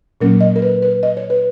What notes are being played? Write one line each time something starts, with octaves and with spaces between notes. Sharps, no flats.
A#2 F#3 A#3 C#4 A#4
D#5
A#4
B4
B4
D#5
C#5
B4